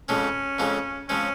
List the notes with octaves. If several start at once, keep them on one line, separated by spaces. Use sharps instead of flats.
F2 C#3 F3 G#3 C4 C#4
F2 C#3 F3 G#3 C4
C#3 F3 G#3 C4 C#4